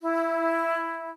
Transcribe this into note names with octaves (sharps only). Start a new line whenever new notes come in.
E4